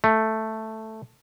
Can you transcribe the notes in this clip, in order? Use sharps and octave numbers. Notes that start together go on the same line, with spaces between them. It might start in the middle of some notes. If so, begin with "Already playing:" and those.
A3